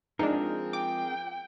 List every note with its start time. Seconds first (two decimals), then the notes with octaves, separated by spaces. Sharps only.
0.19 F3 G#3 C4 D4 D#4 G#4 A#4
0.73 G5 D6